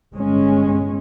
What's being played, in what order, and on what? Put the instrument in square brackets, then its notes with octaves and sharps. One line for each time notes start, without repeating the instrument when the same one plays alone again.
[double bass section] G1 G#3 C#4